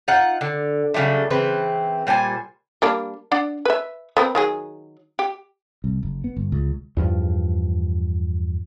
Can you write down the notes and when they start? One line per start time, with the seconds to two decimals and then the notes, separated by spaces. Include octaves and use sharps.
0.08 D#4 F4 F#5
0.41 D3
0.94 C#3 F#3 G3 A3
1.30 C#3 E3 C4 B4
2.07 A#2 G3 C5 G#5
2.82 G3 A#3 D4
3.32 D4 D5 F#5
3.65 B4 E5
4.17 B3 C4 A#4
4.35 D#3 F#3 G#4
5.19 G4
5.84 C2
6.03 F#1
6.24 B3
6.37 G1
6.52 C#2
6.97 E2 G2 F3